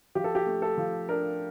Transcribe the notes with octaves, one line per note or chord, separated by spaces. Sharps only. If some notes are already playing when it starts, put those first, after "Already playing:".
F3 G4
A4
G4
A3
A4
F3
D4 A#4